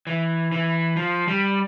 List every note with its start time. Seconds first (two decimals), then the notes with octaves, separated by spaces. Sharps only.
0.07 E3
0.52 E3
0.97 F3
1.28 G3